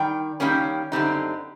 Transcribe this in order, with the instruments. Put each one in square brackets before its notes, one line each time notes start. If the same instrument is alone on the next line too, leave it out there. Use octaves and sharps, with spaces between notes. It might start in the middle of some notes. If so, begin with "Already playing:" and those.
Already playing: [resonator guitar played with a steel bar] D#3 G3 G5
D#3 G3 A#3 C#4
F#2 D3 G3 C4 D#4